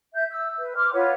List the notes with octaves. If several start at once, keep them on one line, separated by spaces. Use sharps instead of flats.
E5 G6
E6
B4
C6 D6 F6
F4 B4 C#5 F#5